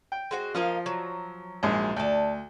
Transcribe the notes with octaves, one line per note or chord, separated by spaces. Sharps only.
G5
G#3 F#4 C5
F3 A#3 D#5 F5
F#3
A#1 G#2 G#3
D2 D5 A5